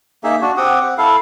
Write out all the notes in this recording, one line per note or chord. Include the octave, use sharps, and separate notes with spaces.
A#3 D#4 G#4 E5
D4 F#4
C4 G4 F#5 D#6
C4 F#5
E4 A4 F5